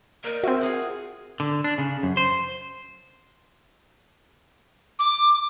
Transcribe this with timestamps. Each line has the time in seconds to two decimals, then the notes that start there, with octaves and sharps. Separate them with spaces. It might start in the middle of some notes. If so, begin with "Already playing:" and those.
0.24 A#3 D#4 A#4
0.43 C4 F#4 E5
0.61 F4 G#4 F#5
1.40 D3
1.64 D4
1.78 C#3
2.03 F#2
2.17 C5
4.99 D6